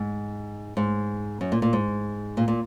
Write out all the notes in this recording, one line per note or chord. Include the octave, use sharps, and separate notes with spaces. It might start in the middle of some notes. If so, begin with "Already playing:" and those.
Already playing: G#2
G#2
F#2
A#2
A#2
G#2
A#2
A#2